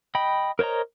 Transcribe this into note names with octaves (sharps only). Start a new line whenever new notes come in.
D#5 G5 B5
A#4 C5 C#5 D#5 A#5